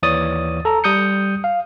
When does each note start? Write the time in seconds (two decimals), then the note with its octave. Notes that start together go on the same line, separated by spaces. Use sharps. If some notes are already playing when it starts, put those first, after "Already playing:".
0.03 D#2 E3 C#5 D5 D#6 A6
0.65 A4 A#5
0.84 G3 D#6 G6 C#7
1.44 F5